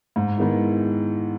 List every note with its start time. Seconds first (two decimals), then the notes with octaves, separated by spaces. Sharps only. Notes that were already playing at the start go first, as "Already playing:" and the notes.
0.16 G#2
0.38 D#3 G#3 B3 E4